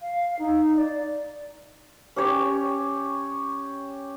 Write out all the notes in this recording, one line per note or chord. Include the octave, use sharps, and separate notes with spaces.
F5
D#4
D5
C#4 G4 C#5